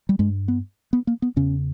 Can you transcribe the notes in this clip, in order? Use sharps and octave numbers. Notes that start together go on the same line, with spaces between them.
G3
G2 G#3
B3
B3
A#3
B3
E2 C#3 C#4